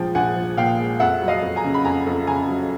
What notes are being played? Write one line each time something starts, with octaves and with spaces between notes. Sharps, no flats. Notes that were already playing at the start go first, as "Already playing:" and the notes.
Already playing: A#1 F3 G#3 G5
A#1 F#5 G#5
F3
A#2 F5 G5
G#3
F2 E5 F#5
F#3
D#5 F5
F2
G#5 A#5
C#3
B5
F2 G#5 A#5
F2
C#3 G#5 A#5
F#3